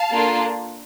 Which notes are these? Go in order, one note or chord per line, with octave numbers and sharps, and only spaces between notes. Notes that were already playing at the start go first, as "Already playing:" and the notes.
Already playing: F5 A5
A#3 D4 F4 A4